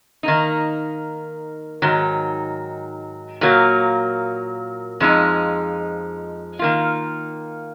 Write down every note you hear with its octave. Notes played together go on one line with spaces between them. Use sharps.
D#3 A#3 D#4
G#2 D#3 F#3
A#2 F#3 A#3
F2 F3 G#3 D#4
D#3 A#3 F4